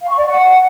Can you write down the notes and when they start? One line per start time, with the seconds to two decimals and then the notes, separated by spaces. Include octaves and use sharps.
0.01 F5
0.09 C#6
0.17 D5
0.26 F#5